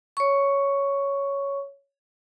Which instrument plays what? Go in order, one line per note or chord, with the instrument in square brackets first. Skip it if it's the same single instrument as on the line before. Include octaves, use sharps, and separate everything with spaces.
[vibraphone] C#5 C#6